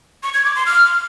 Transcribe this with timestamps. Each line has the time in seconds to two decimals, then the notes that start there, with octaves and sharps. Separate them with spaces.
0.23 C#6
0.34 G#6
0.45 D6
0.55 C6
0.66 F6